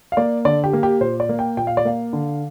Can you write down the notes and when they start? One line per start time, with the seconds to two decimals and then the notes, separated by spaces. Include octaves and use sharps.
0.12 F5
0.17 A#3 D5
0.45 D3 D5
0.64 G4
0.73 A#3
0.83 G4
1.01 A#2 C5
1.20 D5
1.29 A#3
1.39 G5
1.57 A#2 G5
1.67 F5
1.77 D5
1.85 A#3 F5
2.13 D3